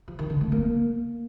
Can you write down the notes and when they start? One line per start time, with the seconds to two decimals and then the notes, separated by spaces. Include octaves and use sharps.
0.08 F3
0.19 D#3
0.30 D3
0.41 A3
0.52 A#3